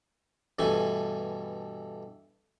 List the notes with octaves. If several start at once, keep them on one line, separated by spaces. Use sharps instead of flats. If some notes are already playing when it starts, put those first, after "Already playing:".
G2 B2 E3 A3 G#5